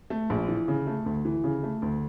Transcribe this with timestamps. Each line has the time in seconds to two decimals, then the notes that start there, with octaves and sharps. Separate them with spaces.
0.10 A3
0.30 A#1
0.48 E3
0.68 C#3
0.87 A3
1.06 D2
1.25 E3
1.44 C#3
1.63 A3
1.82 D2